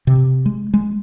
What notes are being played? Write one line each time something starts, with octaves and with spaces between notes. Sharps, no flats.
C3
G#3
G#3